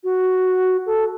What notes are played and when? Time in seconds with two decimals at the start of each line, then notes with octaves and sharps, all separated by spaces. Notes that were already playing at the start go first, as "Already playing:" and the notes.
0.04 F#4
0.86 A4